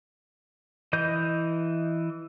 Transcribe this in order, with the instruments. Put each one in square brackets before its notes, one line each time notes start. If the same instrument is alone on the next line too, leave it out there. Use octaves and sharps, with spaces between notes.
[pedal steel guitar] E3 D#5 G6